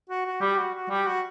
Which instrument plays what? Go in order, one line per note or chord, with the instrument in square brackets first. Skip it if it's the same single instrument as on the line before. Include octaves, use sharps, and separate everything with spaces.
[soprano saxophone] F#4
F#4
[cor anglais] G3 [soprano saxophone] G4
[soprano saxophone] F#4
F#4
[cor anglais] G3 [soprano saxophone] G4
[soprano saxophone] F#4